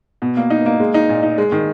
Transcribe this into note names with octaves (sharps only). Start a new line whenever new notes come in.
B2
A#3
D#4
A#3
G#3
D#4
A#2
D#4
G#3
D#3